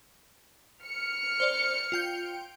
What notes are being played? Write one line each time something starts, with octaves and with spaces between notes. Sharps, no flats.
F6 C#7
C5 D5
F4 G5 G6